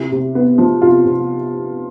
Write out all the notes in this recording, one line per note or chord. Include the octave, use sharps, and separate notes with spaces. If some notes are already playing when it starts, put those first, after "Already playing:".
Already playing: C3 E4
C3
B3
F3
C3 F4
C3